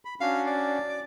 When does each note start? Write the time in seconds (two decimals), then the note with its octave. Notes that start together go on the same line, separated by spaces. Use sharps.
0.05 B5
0.21 C#4 D4 F#4 F5
0.47 D5
0.89 D6